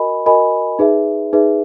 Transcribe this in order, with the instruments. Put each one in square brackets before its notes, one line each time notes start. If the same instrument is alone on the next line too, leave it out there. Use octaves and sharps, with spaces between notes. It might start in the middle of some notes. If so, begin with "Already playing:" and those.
Already playing: [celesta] F#4 A#4 D#5 G#5 B5
F#4 A#4 D#5 G#5 B5
D#4 G#4 B4 E5
D#4 G#4 B4 E5